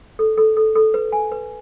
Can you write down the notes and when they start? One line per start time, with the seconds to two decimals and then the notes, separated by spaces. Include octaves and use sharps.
0.19 A4
0.38 A4
0.57 A4
0.75 A4
0.94 B4
1.12 G#5
1.32 B4